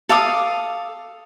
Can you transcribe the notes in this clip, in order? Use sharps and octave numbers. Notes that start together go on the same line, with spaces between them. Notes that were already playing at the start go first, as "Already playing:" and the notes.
A4 F5 D6 D#6